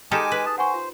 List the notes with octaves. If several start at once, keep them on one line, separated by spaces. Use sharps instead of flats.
G#3 D#4 G4 A4 G#5 D6 F6 E7
B4
G#4 A5
C5 F#5 G#5 C#6
F4